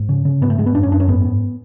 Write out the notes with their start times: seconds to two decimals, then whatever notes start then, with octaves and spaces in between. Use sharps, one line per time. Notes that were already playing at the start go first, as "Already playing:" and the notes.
Already playing: G#2
0.09 C#3
0.25 C#3
0.41 G#2 B3
0.50 A3
0.58 G#2 G#3
0.66 B3
0.75 F#2 D4
0.83 C#4
0.91 F#2 D4
1.00 C#4
1.08 G#2 B3
1.25 G#2